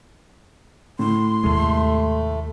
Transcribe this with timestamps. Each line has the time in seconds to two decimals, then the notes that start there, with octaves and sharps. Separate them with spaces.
0.99 A2 C6
1.44 D#2 C3 G#3 A3